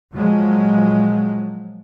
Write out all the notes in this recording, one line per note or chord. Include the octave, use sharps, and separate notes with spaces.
A#2 F3 F#3 G#3